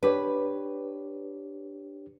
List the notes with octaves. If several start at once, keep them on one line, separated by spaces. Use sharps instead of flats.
D4 G4 B4 C#5